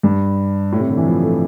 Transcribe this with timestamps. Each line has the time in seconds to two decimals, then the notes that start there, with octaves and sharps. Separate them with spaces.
0.03 G2
0.72 A2
0.80 C3
0.89 D3
0.97 E3
1.06 F3
1.22 A3